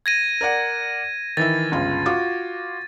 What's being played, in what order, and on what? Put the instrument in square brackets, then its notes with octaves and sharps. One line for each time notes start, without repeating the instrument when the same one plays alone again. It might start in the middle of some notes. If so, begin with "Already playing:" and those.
[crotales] G#6 A#6 D#7
[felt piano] A#4 D5 F#5
[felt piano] D#3 E3 E4 [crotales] A6
[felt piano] G1 C#2 F4
F4 F#4 D6